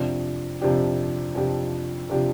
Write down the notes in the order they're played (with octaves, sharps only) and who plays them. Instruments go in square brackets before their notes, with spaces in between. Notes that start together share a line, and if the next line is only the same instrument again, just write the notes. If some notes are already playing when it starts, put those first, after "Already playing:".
Already playing: [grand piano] F2 C3 F3 D4 G4
F2 C3 F3 D4 G4
F2 C3 F3 D4 G4
C3 F3 D4 G4